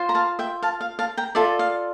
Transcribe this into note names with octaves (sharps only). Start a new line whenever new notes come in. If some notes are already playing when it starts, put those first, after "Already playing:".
Already playing: F4 C5
A#5
F5 A5
E5 G5
F5 A5
F5
F5 A5
G5 A#5
F4 A4 D5 E5
F5